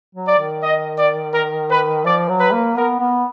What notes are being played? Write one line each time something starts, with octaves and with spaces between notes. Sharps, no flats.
F#3
D5
D#3
D#5
D5
A#4
B4
F3 D5
F#3
B4
A#3
B3 A#4
B3